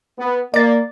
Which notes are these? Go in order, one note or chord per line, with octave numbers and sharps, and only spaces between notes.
B3
A#3 D5 A6